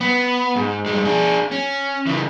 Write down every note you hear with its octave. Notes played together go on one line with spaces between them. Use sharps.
B3
G#2
G2 G#3
D4 G#4
C#4
C#3 E3